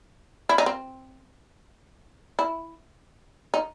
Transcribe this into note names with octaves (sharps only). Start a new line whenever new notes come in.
E4
D#4
C4
E4
D#4